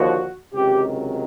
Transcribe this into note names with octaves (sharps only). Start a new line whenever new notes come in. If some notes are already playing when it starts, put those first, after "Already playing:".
Already playing: D#2 D3 F3 F#4
C#2 C3 D#3 F#3 G4